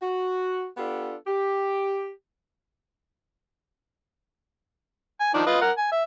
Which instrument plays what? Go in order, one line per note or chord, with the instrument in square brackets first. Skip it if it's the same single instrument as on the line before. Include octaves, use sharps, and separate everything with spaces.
[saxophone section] F#4
B3 D4 F4 G4 A4
G4
[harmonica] G#5
D#3 F3 D4
F4 B4 D#5
A#4 F#5
G#5
E5